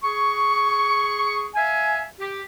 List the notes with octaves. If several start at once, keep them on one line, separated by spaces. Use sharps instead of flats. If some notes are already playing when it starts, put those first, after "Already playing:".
G#4 C#6
E5 F5 G#5
G4